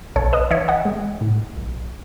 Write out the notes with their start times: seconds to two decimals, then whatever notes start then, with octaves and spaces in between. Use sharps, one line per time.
0.16 B1 A4 C#5
0.33 B4 D#5
0.51 E3 C#5 E5
0.68 D#5 F#5
0.85 G#3
1.21 A2
1.56 B1